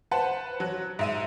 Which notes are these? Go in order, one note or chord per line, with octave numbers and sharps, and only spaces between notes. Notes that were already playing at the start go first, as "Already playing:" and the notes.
B4 C5 F#5 A5
F#3 F#6
G#2 E5 D#7